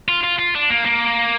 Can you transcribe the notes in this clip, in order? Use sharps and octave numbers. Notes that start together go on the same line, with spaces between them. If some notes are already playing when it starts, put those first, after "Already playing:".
F4
F4
F4
D4
A#3
A#3